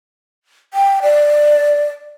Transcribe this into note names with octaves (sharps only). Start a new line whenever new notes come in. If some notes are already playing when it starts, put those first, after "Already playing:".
G5
D5